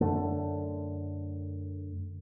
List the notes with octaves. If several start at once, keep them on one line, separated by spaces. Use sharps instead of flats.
F#2 D3 A3